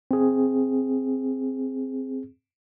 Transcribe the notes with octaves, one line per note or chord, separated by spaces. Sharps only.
C4 G#4